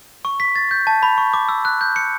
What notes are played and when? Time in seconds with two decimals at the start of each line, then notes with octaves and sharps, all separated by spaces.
0.25 C#6
0.40 B6
0.56 A6
0.71 G6
0.87 A5
1.03 B5
1.18 C#6
1.33 D6
1.49 E6
1.65 F#6
1.81 G6
1.96 C#7